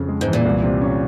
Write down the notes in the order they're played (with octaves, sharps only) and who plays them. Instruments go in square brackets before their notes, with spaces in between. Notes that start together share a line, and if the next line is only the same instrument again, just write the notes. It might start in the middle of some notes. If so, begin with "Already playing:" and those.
Already playing: [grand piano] F2 C#3
G#3
[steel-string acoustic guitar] G#2
[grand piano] E3
[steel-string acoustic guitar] A#2
[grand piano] C2
C3
C#4